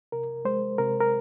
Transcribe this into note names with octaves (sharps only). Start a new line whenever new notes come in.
C3 A#4
G#3 C5
C3 A#4
A#4